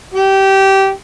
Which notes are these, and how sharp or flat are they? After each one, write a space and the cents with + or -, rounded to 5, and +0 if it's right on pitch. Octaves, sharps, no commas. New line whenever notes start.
G4 -20